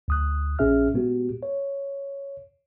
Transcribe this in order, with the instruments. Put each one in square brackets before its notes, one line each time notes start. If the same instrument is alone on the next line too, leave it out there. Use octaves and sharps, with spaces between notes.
[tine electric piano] D2 D#6 F#6
A#1 A#2 C#4 G#4 E5 F6
A#2 G#3 B3 F#4 G4
C#5